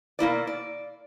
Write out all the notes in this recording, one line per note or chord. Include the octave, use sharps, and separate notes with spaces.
B2 A#3 E4 D5
D5